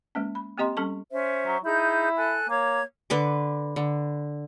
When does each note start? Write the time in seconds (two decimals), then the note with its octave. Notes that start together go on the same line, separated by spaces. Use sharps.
0.15 G#3 A#3 C#4
0.35 B5
0.58 A#3 C4 G4 D#5 A#5 C6
0.77 G3 C#4 A4 A5 C#6
1.11 C#4 C5 E5
1.47 F#3
1.64 D#4 E4 G#4 G6
2.15 A4 G#5 F#6
2.49 A#3 C#5 G#6
3.10 D3 B4 D6
3.76 D3